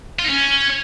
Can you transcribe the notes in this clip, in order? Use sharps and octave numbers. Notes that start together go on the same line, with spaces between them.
F4
D#4
C#4